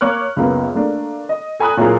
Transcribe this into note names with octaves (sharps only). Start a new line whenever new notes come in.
A#3 C#5 C#6 D6 F6 F#6
C#2 F#2 A#3 B3
A3 A#3 D4
D#5
A4 G#5 A#5 B5 D#6 F#6
A#2 F#3 A#3 E4 G#4 A#4